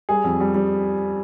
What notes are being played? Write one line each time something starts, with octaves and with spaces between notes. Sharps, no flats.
G3 G#4
F2
G3
G3